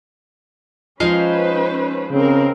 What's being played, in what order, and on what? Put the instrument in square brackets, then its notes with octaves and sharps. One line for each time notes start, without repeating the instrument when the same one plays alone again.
[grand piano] F3 [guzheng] G#3 D#4 F5 [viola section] C#4 B4 C5
[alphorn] C#3 [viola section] C4 A#4